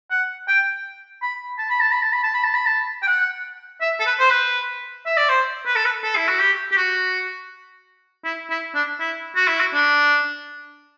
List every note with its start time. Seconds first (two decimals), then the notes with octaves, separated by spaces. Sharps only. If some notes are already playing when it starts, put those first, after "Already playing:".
0.10 F#5
0.48 G5
1.22 B5
1.59 A5
1.69 B5
1.80 A5
1.91 B5
2.02 A5
2.12 B5
2.23 A5
2.34 B5
2.43 A5
2.54 B5
2.66 A5
3.02 G5
3.07 F#5
3.81 E5
4.00 A4
4.06 B4
4.19 C5
4.30 B4
5.06 E5
5.17 D5
5.29 C5
5.66 B4
5.75 A4
5.85 B4
6.03 A4
6.16 E4
6.28 F#4
6.40 G4
6.72 G4
6.76 F#4
8.25 E4
8.50 E4
8.74 D4
9.00 E4
9.36 F#4
9.48 E4
9.60 F#4
9.74 D4